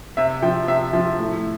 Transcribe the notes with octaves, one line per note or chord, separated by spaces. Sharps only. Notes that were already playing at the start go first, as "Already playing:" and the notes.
C3 E5
F3 G5
C3 E5
F3
A2